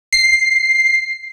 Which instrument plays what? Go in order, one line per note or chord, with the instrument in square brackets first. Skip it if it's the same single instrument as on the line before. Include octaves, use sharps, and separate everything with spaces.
[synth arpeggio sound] C7